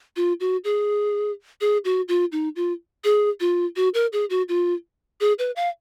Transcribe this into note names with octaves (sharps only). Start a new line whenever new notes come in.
F4
F#4
G#4
G#4
F#4
F4
D#4
F4
G#4
F4
F#4
A#4
G#4
F#4
F4
G#4
B4
F5